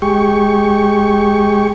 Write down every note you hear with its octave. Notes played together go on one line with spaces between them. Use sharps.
G#3 G4 C#6